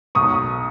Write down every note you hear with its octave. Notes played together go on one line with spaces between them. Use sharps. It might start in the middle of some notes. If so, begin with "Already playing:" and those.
B1 C#6 D#6